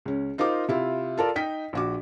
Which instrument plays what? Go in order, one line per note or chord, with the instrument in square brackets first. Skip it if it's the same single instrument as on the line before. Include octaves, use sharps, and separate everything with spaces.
[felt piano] C#2 C#4
D#4 F4 A#4 C5 D6
C3 E4 F4
F4 A4 A#4 D5
D#4 D#5 G5 B6
A#1 F#4 D6